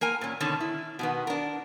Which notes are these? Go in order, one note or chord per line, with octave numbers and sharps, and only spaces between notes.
A#3 A#4 G#5
A#2 C#4
B2 D3 D#3 C#4
E4
B2 D#3 B3
D4 A#4